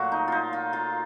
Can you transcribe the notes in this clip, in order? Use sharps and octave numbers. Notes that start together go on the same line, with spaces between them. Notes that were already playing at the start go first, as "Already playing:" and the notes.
Already playing: A#2 F#3 A3 F#4
D#4
D#4 F4
F4
F4